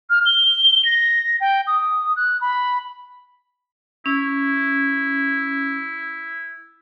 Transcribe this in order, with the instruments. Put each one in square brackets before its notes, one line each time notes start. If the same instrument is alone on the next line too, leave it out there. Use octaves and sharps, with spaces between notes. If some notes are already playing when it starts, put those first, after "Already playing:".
[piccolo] F6
G7
A#6
G5
D#6
F#6
B5
[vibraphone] C#4 [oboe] E4